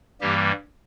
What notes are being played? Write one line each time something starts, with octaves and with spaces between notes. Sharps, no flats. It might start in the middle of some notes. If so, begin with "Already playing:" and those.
G2 E3 G3 A#3 G4